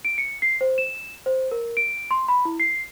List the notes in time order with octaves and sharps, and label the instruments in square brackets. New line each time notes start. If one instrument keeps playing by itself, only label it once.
[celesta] D7
C#7
C7
C5
E7
C5
A#4
D7
C6
B5
E4
C7